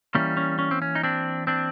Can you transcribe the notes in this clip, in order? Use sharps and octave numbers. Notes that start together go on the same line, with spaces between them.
E3 G3 A#3 C#4
C#4
C#4
C4
C#4
D#4
C4 D4
C4 D4